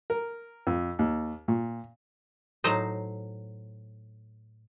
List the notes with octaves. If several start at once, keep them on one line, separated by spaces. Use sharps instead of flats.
A#4
F2
D#2
A#2
A2 F#3 D#4 C5 D#5